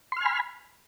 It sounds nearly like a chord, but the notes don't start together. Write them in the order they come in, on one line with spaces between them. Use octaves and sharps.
C6 F6 G#5 B5